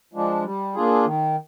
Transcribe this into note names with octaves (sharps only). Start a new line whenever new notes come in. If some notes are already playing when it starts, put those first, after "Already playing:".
F3 G#3 D4
G3
A#3 D4 F4 G#4
D#3